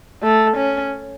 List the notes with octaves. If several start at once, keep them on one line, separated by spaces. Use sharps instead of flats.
A3
C#4